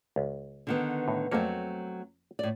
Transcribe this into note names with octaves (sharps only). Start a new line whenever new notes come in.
C#2
D3 D#3 B3
A2
F2 F#3 A3 A#3 C4 C#5
A2 D5